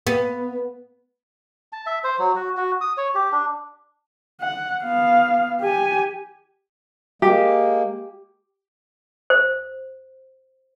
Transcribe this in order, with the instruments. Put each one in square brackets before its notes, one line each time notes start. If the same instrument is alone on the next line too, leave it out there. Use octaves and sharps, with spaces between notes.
[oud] B3
[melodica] A5
E5
C5
F#3
F#4
F#4
D#6
C#5
G4
D4
[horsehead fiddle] F#5
B3 F5
G4 G#5
[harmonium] G#3 A#3 [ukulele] G4
[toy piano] C5